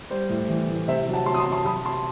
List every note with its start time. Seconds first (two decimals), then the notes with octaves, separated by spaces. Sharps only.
0.10 G3 C5
0.29 A2
0.48 E3
0.68 A2
0.87 C3 C5 E5
1.08 F#3
1.13 F#5 A5
1.26 F#3 A5 C6
1.34 D#6
1.39 A5 C6
1.45 C3
1.52 A5 C6
1.65 F#3 B5 D#6
1.85 C3 A5 C6